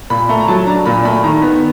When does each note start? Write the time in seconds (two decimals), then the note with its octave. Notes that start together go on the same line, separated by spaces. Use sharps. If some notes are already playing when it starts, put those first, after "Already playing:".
0.10 A#2 B5
0.29 A3 A#5
0.40 A#5
0.48 F#3 A5
0.67 D4 A#5
0.86 A#2 B5
1.05 A3 B5
1.24 D#3 A#5
1.42 B3